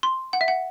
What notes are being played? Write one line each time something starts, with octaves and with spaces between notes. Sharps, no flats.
C6
F#5
E5
F#5